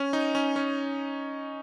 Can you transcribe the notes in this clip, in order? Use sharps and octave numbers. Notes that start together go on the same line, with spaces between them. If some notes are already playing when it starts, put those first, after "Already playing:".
Already playing: C#4
D#4
C#4
C#4